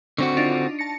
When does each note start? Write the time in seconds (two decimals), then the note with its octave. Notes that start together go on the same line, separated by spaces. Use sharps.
0.18 D3 C4 F#4 C#6
0.37 D4 D#4 F4
0.79 A5 A#6 C#7